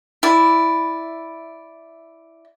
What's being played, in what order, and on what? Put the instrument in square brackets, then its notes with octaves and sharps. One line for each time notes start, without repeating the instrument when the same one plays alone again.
[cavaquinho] E4 D5